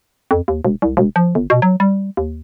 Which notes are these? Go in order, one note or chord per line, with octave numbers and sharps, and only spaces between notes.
F2
D#2
E1
C2
E1
F3
G1
B2
F#3
G3
D#2